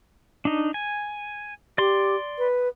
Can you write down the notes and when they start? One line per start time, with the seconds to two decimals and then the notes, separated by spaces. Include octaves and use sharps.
0.45 D4 D#4
0.74 G#5
1.78 G4 D5 C6
2.38 B4